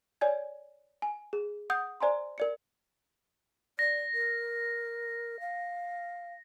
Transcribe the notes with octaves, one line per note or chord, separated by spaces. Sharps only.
C#5 D5 G#5 G#6
G#5
G#4
F#5 D#6 G6
C5 D5 G#5 A#5 C6
A#4 D5 C#7
D5 A#6
A#4
F5